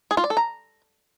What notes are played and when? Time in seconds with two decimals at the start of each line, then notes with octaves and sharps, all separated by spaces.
0.11 G#4
0.17 F4
0.24 D5
0.30 A4
0.37 A#5